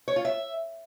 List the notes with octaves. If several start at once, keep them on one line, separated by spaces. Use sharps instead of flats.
C#5
F4
E5